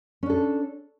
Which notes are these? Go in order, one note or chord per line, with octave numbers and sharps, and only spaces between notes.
C#4 D4 A4